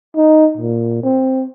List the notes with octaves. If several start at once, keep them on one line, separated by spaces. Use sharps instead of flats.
D#4
A#2
C4